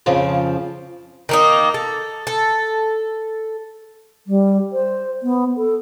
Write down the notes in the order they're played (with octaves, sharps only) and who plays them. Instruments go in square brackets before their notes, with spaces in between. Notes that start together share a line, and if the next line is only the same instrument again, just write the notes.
[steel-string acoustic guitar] F2 C#3 F3 C4
[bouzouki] D#3 A#3 D#4
A4
A4
[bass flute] G3
C5
B3
A4